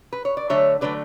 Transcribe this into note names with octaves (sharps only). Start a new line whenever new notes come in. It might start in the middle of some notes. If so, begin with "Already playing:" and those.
B4
C#5
D5
D3 F#3 A3 C#5 E5
D3 F#3 A3 B4 D5